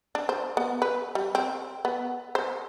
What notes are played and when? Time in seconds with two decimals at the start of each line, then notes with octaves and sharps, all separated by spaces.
0.15 D4
0.29 C5
0.57 B3
0.82 B4
1.15 G3
1.35 C4
1.85 B3
2.35 C5